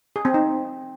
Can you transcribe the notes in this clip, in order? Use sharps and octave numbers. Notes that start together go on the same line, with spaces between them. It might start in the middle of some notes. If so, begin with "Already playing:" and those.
G#4
C4
D#4